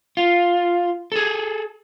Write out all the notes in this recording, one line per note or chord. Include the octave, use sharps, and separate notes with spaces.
F4
G#4 A4